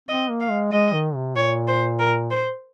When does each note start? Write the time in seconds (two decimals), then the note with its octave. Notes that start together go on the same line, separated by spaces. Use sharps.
0.09 C4 D#5
0.30 A#3
0.40 F5
0.51 G#3
0.72 G#3 D#5
0.93 D#3
1.15 C3
1.36 A#2 C#5
1.68 C5
1.99 A#4
2.31 C5